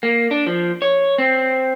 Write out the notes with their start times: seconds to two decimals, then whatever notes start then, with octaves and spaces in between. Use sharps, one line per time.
0.03 A#3
0.31 D4
0.47 F3
0.82 C#5
1.18 C4